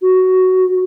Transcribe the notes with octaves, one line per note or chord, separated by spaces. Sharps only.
F#4